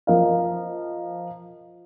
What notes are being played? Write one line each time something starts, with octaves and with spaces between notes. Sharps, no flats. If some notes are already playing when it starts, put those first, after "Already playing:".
F3 A#4 D#5 F5